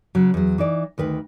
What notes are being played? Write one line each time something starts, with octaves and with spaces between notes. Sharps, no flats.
C#3 F#3
E2 F#3
E3 D#4 D5
D2 D#3 B4